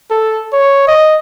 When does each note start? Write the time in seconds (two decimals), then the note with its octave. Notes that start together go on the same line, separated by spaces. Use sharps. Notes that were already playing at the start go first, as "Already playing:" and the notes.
0.11 A4
0.52 C#5
0.88 D#5